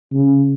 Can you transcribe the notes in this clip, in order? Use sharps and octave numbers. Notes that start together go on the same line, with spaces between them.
C#3